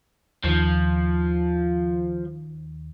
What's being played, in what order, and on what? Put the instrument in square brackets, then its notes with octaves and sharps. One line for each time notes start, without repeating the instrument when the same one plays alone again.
[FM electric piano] D#2 D#3 [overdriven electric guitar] F3